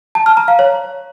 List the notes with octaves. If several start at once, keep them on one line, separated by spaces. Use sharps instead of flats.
A5
F6
A#5
F5
C#5